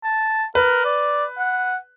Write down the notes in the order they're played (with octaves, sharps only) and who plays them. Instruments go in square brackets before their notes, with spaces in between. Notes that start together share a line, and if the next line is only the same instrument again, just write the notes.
[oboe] A5
[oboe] A#4 [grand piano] B4
[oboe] D5
F#5